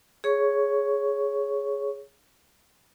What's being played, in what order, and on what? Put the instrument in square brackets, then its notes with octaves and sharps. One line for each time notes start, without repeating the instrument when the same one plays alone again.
[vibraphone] G#4 C#5 C#6